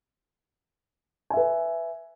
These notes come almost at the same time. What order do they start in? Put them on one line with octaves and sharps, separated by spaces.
G#5 E5 B4